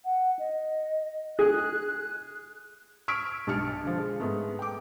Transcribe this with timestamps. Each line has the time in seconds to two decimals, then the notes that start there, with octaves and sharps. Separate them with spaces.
0.05 F#5
0.39 D#5
1.39 G#4 F#6
3.08 C#6 E6 F6 G#6 B6 D7
3.47 B1 G2 B2 A5 F6 C#7
3.83 D3 F3
3.97 G#3
4.20 G#2 A3 B3
4.59 G5 D6